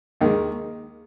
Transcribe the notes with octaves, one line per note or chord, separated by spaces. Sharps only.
D#2 D#3 G#3